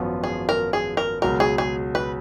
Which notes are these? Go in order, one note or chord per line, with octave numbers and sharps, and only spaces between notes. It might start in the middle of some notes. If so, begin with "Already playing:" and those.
Already playing: G#1 F#2 F3 B3 F#4
G#4
A#4
G#4
A#4
C#2 B2 F#3 A#4
G#4
G#4
B4